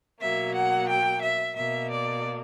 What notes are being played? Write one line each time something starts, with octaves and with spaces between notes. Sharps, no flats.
B2 F#3 A#3 E5
F#5
G5
E5
B2 A#3 E5
D5